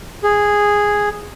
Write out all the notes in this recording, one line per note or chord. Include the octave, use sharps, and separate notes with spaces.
G#4